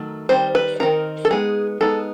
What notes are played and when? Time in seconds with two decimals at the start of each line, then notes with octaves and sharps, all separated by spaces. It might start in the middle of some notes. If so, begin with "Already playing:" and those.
Already playing: D#3 F#3 A3
0.29 D#3 G3 C4 C5
0.55 B4
0.80 D#3 G3 C4 D#4 A#4
1.25 A4
1.30 G#3 B3 D#4 G#4
1.81 G#3 B3 D#4 A4